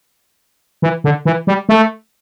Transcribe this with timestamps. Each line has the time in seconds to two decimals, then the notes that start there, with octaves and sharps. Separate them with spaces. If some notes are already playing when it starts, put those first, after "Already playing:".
0.82 E3
1.04 D3
1.25 E3
1.47 G3
1.69 A3